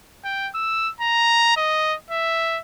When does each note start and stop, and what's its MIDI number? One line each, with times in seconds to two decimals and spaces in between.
0.24 0.49 79
0.55 0.90 88
1.00 1.55 82
1.57 1.95 75
2.11 2.60 76